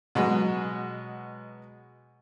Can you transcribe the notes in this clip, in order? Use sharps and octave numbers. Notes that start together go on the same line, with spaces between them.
B2 F#3 G#3